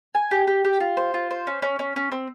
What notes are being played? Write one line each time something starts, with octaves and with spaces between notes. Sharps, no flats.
G#5
G4
G4
G4
F4
C5
F4
C5
C#4
C#4
C#4
C#4
C4